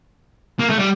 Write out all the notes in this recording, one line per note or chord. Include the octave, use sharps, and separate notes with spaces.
A#3
A3
G3